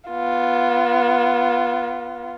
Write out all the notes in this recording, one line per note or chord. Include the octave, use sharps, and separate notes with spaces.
B3 F4